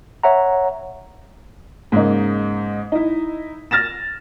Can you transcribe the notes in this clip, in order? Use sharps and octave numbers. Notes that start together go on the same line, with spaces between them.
C#5 E5 F#5 A#5
G#2 C#3 A#3 D#4
D#4 E4
F6 A6 A#6 E7